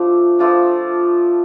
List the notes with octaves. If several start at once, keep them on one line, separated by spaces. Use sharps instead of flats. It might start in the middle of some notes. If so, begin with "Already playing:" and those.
Already playing: F3 A3 D4
F3 A3 D4 F4